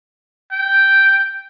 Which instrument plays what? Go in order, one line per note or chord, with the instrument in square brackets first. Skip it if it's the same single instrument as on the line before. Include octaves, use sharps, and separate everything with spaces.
[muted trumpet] G5